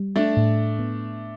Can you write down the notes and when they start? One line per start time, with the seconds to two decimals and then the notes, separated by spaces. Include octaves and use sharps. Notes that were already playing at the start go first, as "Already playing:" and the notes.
Already playing: G3
0.16 A3 D4
0.37 A2
0.79 B3